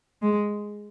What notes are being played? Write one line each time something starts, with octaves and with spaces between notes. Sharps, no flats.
G#3